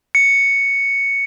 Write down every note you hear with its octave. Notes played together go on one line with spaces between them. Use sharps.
C#7